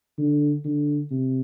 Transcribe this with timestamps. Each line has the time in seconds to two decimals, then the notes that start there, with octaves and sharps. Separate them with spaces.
0.18 D3
0.64 D3
1.11 C3